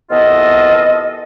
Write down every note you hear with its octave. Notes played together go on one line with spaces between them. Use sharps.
C2 E3 B3 F4 A4 D#5